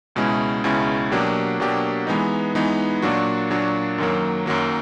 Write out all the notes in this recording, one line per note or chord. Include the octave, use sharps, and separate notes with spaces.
C#2 B2 G#3 C#4 E4
C#2 B2 G#3 C#4 E4
B2 F#3 A#3 D4 G4
B2 F#3 A#3 D4 G4
E3 G#3 B3 D#4
E3 G#3 B3 D#4
A#2 F#3 A#3 D4 F#4
A#2 F#3 A#3 D4 F#4
F#2 D#3 F#3 A#3
F#2 D#3 F#3 A#3